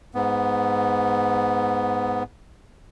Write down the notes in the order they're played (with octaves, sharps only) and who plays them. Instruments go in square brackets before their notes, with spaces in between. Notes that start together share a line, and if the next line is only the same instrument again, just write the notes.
[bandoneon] G#2 B3